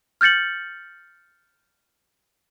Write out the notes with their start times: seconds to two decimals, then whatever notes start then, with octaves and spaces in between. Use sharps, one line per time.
0.21 F6 G6 A6 C#7 F#7